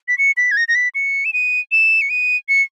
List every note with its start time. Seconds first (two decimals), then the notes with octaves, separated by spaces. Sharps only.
0.08 B6
0.18 C#7
0.37 B6
0.51 G#6
0.57 A#6
0.68 A#6
0.75 B6
0.95 C#7
1.25 E7
1.33 D#7
1.72 E7
2.01 C#7
2.10 D#7
2.49 C#7